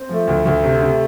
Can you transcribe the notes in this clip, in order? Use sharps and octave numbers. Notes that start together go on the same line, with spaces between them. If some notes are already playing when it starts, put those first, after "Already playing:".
Already playing: C4
F3 A3
D2
D2
C3
C3